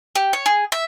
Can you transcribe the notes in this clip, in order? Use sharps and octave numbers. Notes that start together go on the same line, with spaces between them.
G4
C#5
G#4
E5